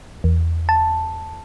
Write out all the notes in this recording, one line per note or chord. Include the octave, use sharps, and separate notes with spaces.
E2
A5